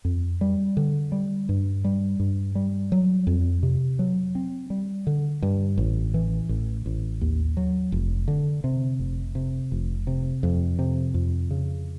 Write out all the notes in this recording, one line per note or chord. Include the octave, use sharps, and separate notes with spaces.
F2
G3
D3
G3
G2
G3
G2
G3
F#3
F2
C3
F#3
C4
G3
D3
G2
A1
E3
A1
A1
D#2
F#3
F1
D3
C3
F1
C3
F1
C3
F2
C3
F2
C#3